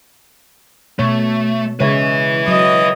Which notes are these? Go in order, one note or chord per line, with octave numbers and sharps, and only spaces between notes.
B2 A3 C#5
C#3 G#3 B4 C#5 E5
F#3 D#5